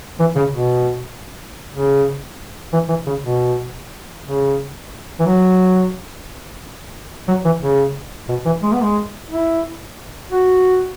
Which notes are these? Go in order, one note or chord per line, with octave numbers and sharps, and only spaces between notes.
E3
C#3
B2
C#3
E3
E3
C#3
B2
C#3
E3
F#3
F#3
E3
C#3
B2
E3
G#3
B3
G#3
E4
F#4